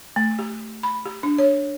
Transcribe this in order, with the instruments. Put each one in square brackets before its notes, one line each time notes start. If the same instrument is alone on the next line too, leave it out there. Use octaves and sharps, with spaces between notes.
[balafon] A3
G4
B5
G4
D4
C#5